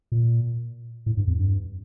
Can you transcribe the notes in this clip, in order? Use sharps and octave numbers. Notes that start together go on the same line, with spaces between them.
A#2
A2
G2
F2
G2